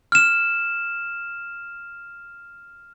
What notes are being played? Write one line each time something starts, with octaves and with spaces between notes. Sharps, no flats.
F6 E7